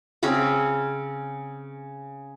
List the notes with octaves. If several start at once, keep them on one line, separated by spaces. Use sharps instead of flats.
C#3 C4 C#4 G#4